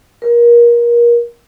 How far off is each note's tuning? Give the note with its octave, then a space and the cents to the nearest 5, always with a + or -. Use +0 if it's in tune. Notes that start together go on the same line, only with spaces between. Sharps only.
A#4 +30